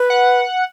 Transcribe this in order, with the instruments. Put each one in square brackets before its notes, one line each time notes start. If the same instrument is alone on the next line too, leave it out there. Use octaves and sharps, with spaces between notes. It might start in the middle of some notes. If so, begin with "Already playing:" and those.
Already playing: [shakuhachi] B4
[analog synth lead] F#5